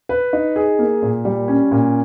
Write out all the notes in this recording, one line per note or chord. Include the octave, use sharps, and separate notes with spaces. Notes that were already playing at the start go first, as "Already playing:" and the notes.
B4
D#4
G#4
A#3
A#2
G3
C#4
A#2